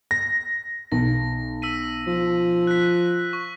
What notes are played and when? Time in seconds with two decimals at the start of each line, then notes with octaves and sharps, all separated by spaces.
0.11 A#6
0.92 B1 A#6
1.62 E6 B6 D#7
2.07 F3
2.67 F#6 B6
3.33 C#6